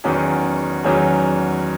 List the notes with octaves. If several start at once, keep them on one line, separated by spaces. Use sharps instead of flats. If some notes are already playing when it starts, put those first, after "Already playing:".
E2 D#3 F#3 C#4 G#4
E2 D#3 F#3 C#4 G#4